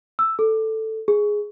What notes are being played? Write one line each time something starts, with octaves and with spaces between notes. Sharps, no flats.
E6
A4
G#4